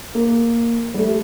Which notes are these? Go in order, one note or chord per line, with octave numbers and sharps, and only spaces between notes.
A#3
G3
A3